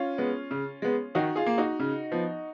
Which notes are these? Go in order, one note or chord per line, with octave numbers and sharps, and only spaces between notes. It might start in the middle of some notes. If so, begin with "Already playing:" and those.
Already playing: C#4 F4
G#3 B3
C#3
G#3 B3
D#3 D#4 F#4
F4 G#4
A#3
D#4 F#4
C#3
F3 B3